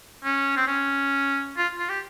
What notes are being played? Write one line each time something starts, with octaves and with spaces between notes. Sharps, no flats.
C#4
C4
C#4
F4
F4
G4